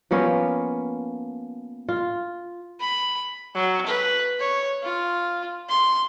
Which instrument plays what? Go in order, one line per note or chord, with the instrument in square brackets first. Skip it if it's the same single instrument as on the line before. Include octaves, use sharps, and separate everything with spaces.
[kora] F3 A#3 B3 C#4
F4
[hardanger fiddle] B5
[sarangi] F#3
B4
C#5
F4
C6